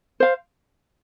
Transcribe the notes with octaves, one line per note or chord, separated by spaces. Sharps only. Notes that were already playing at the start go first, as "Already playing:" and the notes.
C5 F5